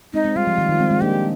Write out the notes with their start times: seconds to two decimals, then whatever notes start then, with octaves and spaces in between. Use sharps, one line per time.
0.14 G#3 C4 D#4
0.25 G#3 C4
0.36 G3 F4
0.47 F3
0.58 D#3
0.69 D#3
0.79 G#3 C4
0.90 G#3 C4
1.01 A#3 D4 G4